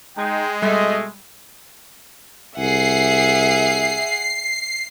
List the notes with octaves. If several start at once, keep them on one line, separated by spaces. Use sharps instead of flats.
G#3 D#4 G5
B2 G3 A3 D#5 E6
C2 G#4 E5 F#5 C7